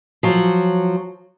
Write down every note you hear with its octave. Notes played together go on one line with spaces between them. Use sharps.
F3 F#3